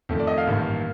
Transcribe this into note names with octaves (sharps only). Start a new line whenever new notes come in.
F2 D#3 A3
D5
D#5
F5
A1 G2 D#3 A#3